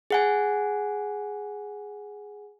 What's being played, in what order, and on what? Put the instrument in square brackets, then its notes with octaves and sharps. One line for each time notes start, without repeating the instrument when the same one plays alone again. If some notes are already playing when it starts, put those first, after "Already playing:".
[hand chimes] G#4 F#5 G#5